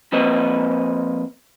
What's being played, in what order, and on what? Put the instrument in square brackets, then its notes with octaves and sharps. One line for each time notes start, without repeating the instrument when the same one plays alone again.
[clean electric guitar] F3 A#3 C4 B4 D#5